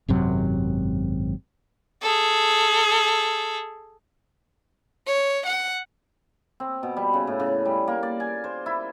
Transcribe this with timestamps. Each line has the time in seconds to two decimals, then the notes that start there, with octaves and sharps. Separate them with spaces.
0.08 G#1 F#2 C3 F#3
2.02 G#4 A4
5.07 C#5
5.46 F#5
6.60 C4
6.83 B2
6.97 G3
7.14 C#3
7.27 A2
7.40 C#3
7.65 G3
7.88 A#3
8.03 D5
8.20 G#5
8.44 C5
8.66 E4